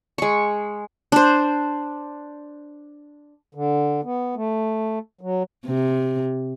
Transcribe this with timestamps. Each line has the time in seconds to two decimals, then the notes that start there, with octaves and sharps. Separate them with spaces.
0.18 G#3 C#6
1.12 D4 C5
3.55 D3
4.04 B3
4.36 A3
5.21 F#3
5.66 C3